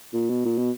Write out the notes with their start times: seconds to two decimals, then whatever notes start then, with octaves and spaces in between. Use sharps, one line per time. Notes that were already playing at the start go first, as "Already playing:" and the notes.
0.13 A#2
0.29 B2
0.45 A#2
0.58 B2